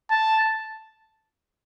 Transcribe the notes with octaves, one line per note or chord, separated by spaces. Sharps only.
A5